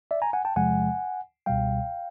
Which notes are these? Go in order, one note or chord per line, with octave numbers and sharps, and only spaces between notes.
D5 E5
G#5 A#5
F#5 G#5
G5 A5
E2 C3 F3 G#3 F#5 G#5
C#2 B2 G3 F5 G5